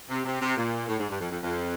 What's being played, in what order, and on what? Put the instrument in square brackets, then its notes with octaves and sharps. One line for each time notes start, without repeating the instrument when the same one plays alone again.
[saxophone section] C3
C3
C3
A#2
A2
G#2
G2
F2
F2
F2